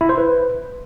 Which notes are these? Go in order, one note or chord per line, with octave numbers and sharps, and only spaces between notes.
E4
C5
B4